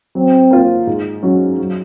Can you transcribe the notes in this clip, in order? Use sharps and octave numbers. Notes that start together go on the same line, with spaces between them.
F#3 C4
A#3 F4 C5
G#2
F#3 C#4 F#4
F#3